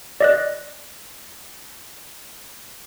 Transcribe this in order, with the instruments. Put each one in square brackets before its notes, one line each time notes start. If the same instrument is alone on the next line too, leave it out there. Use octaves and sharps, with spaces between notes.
[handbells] D5 D#5 F#6